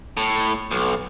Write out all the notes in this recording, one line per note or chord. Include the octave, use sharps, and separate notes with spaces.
A2
B1